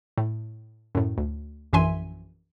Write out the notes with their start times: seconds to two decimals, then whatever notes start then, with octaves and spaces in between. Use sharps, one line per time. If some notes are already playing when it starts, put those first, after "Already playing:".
0.18 A2
0.95 F#2 A2
1.18 D2
1.73 A#1 F#2 E3 E5 G#5 C6